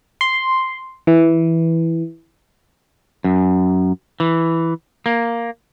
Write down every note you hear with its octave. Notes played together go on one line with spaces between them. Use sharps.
C6
E3
F#2
E3
A#3